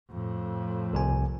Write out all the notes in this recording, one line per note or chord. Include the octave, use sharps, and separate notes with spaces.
F2 A2
C2 C3 G#5